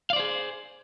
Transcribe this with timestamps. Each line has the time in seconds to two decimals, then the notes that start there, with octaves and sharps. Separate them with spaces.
0.10 F5
0.13 D5
0.16 C5
0.20 G#4